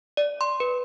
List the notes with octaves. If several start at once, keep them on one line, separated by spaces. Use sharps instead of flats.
D5
C6
B4